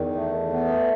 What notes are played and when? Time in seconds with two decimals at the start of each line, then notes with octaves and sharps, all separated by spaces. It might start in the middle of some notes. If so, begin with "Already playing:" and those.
Already playing: E2 D#3
0.16 A3
0.52 B3